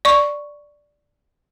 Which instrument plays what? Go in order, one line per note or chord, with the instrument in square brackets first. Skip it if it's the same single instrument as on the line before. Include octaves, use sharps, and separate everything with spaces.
[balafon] D5 C#6